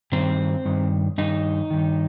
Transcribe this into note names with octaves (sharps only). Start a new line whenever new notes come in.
G2 D#3 C4
G2 D#3
G2 D#3 D#4
G2 D#3